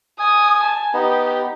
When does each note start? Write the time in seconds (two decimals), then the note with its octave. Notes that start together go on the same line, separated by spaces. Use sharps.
0.20 G#5 D#6
0.63 A5
0.94 B3 D#4 G4